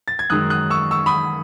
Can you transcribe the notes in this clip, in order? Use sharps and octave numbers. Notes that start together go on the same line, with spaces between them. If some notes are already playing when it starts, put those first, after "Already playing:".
A6
G#6
F#2 D#3 G#3 D#6 F#6
D#6 F#6
C#6 E6
C#6 E6
B5 D#6